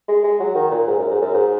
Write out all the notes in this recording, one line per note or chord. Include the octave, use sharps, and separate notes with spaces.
G#3
G#3
F#3
D#3
A#2
G#2
F#2
G#2
F#2
G#2